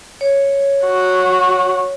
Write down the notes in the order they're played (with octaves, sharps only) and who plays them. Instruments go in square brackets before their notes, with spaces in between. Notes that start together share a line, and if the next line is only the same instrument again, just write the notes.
[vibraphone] C#5
[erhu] F#4